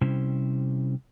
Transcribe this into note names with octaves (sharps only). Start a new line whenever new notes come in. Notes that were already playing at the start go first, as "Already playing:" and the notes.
C3 G3 C#4 E4 C5